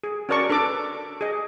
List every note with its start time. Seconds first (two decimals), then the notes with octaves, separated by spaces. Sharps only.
0.04 G#4
0.29 C#4 F#4 A#4 D5 A5 C#6
0.50 D4 A4 B4 D6
1.21 G#4 D#5